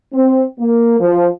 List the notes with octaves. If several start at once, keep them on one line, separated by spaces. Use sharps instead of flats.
C4
A#3
F3